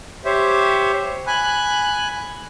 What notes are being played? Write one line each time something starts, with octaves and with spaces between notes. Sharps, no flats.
G4 C5 C#5 E5
G#5 B5 F#6